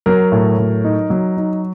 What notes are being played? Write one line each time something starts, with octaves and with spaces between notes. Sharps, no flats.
F#3 A#4
A2
F#3
D#4
F#3
D#4